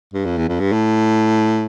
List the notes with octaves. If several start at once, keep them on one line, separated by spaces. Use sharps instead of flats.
G2
F2
E2
F2
G2
A2